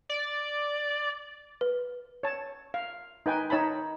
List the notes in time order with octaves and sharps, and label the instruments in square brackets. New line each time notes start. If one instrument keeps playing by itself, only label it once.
[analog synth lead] D5
[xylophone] B4
[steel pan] C#5 A5
F5
D#4 B4 G5 G#5
D#4 C#5 A5 B5